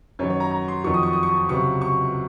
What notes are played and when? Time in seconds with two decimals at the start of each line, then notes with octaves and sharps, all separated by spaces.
0.19 F#2 D#3 F#3 C#5
0.30 C#5
0.40 A#5
0.51 A#5
0.68 C6
0.84 F2 D#3 F#3 C#6
0.94 D#6
1.03 C#6
1.13 D#6
1.23 C#6
1.49 C#2 C3 F#3 C#6
1.81 C#6